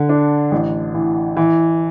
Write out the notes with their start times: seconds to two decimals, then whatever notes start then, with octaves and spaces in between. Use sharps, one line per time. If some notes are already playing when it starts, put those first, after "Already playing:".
Already playing: D3
0.09 D4
0.52 A1
0.94 E3
1.37 E3